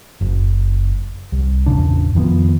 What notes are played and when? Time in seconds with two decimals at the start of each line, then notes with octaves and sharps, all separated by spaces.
0.21 F#1
1.32 C2
1.66 E1 A1 C#3 D4
2.15 F2 D#3 F3 B3